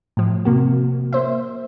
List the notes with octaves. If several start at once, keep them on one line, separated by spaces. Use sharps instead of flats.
A2 F3
C3 A#3 F#4
A#3 C5 E5